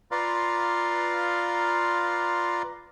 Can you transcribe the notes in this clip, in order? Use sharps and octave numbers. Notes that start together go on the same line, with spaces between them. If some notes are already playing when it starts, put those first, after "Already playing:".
F4 B4 D5 F5 A#5 C6